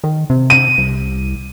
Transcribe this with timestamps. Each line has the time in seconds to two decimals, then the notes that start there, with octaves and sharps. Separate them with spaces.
0.04 D#3
0.30 C3
0.50 D#7
0.78 C2